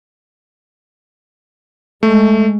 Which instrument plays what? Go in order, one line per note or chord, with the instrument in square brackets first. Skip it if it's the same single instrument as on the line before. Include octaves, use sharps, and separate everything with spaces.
[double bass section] G#3 [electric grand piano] A3